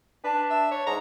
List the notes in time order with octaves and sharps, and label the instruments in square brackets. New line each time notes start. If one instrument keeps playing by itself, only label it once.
[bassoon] D4 [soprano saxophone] B4
[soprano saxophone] E5
C#5
[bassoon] G#2 [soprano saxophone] A#5